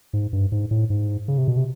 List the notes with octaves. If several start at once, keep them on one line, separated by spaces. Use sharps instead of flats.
G#2
G2
G#2
A2
G#2
C#3
C3
B2
C3